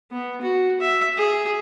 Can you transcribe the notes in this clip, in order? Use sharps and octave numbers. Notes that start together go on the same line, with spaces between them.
B3
F#4
E5
G#4